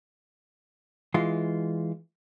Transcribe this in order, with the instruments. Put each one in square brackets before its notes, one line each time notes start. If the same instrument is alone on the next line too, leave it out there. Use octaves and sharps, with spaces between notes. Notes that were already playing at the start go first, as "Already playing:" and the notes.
[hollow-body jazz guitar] E3 G#3 F4